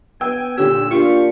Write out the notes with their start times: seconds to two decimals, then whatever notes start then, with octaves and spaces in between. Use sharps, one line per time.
0.21 B3 G5 G#5 E6
0.57 A#2 D3 C#4 G4 E6
0.91 A#3 D4 F4 G4 C#6